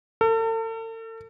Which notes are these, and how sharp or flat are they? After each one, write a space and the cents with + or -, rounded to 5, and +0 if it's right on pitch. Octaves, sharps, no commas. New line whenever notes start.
A4 +40